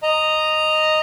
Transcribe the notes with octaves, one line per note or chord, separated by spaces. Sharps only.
D#5 A#5